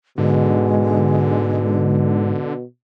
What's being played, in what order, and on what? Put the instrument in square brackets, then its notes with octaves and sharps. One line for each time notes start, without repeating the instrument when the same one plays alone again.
[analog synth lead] G#2 [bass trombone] B2 [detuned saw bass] D3 [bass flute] G#3